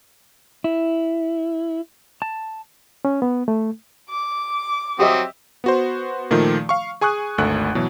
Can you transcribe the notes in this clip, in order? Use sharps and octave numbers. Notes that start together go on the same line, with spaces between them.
E4
A5
C#4
B3
A3
D6
F#3 C4 G4 D#5 E5 D#6
B3 F#4 C5
A#2 D#3 F3 A3
F5 C#6
G#4 G#5 C#6 D#6 F#6
G#1 D2 A3 C#6 F#6
B2 E3 F#3